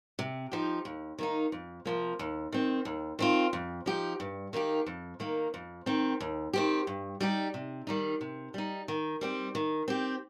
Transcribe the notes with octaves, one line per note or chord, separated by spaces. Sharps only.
C3
F3 D#4 G4
D#2
D#3 A#3 D#4
F2
C3 F3 A#3
D#2
D#3 C4
D#2
D#3 C4 F4
F2
F3 D#4 G4
G2
D#3 A#3 D#4 G4
F2
D#3 A#3
F2
D#3 C4
D#2
D#3 C4 G4
G2
G3 D#4 G4
C3
D#3 G3 D#4
C3
G3 D#4
D#3
G3 C4 G4
D#3
C4 G4